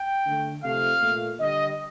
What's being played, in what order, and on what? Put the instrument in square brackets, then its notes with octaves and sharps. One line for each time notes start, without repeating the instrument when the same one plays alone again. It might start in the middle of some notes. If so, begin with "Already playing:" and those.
Already playing: [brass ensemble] G5
D3 A3
C3 F3 A3 F5
A#2 A3
D3 G3 D#5